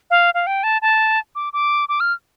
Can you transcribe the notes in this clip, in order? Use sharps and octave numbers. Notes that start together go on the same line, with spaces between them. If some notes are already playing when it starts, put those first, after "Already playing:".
F5
F5
G5
A5
A5
D6
D6
D6
F6